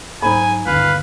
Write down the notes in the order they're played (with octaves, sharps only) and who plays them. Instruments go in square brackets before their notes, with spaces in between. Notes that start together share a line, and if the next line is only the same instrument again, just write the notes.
[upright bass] G#2 F#3 [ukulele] D#4 C5 B5 [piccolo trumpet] G#5
[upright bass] G1 D#2 [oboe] B4 [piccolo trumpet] F5